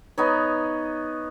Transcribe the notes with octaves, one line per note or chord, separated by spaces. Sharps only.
B3 D#4 C#5